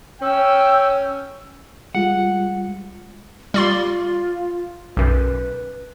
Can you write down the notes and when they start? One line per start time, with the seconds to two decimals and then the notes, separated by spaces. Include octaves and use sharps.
0.22 C#4 G5 E6
1.95 G3 G#3 F4 F#5
3.54 G3 F4 D5 C6
4.97 B1 F#2 B4